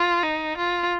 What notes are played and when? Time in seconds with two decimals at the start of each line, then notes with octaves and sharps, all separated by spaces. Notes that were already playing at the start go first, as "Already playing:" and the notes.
Already playing: F4
0.23 D#4
0.57 F4